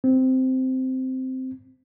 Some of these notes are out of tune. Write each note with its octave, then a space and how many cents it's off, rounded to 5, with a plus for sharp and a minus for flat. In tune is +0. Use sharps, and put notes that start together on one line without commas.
C4 -10